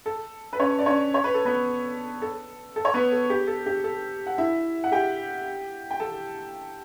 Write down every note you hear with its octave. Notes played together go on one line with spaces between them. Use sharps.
A4
B4
C#4 C#5
D5
C#4 C#5
C#5
B4
A4
B3 B4
A4
A4
C#5
B3 B4
A4
G4
A4
G4
A4
F#5
E4 E5
F#5
G4 G5
G5
A4 A5